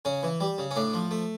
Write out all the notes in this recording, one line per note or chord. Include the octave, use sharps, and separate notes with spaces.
C#3 C#4
E3
G3
C#3
C#4
A2 D4
F3
A3